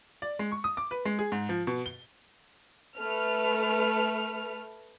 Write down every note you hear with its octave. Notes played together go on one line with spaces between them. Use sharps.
D5
G#3
C#6
D#6
D6
B4
G#3
G#4
G#2
F3
B2
G7
A3 B4 F6